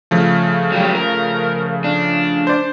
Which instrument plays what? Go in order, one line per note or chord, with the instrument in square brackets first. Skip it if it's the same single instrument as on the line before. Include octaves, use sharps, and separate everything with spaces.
[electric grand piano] C#3 F3 A3
[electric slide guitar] F#3 G4
A#4
D4
[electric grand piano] C5 D5